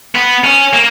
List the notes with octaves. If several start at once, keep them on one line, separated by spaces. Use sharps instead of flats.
B3
C#4
A#3